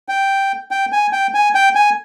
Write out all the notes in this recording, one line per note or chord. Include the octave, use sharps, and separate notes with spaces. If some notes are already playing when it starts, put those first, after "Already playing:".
G5
G5
G#5
G5
G#5
G5
G#5